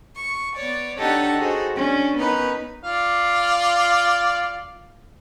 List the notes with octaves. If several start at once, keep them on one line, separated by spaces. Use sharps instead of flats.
C#6
B3 C#5 D5
D4 D#4 G4 A4 C#5 F#5
D#4 F#4 G#4 A4 C5
C#4 D4
B3 C#4 D#4 A#4 B4
F4 D5 F5